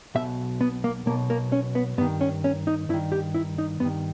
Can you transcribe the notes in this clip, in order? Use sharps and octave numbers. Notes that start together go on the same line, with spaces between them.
B1 B2 E5
B3
A#3
B1 B2 A#3
A#3
C#4
B3
G2 D#3 B3
C#4
C#4
D#4
G2 D#3 E4
G4
E4
D#4
G2 D#3 B3